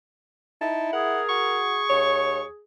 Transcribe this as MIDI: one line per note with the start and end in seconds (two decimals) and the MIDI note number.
0.61 0.91 63
0.61 1.21 64
0.61 0.89 81
0.93 2.63 68
0.93 1.59 70
0.93 1.21 78
1.29 1.81 66
1.29 2.45 85
1.90 2.43 39
1.90 2.42 73